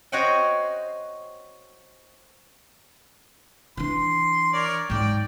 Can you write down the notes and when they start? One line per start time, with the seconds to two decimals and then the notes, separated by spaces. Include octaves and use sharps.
0.12 F#4 C5 C#5 D#5 F#5 G5
3.77 E3 D4 C6
4.53 A#4 C#5 D5
4.90 G#2 F#3 D5 G5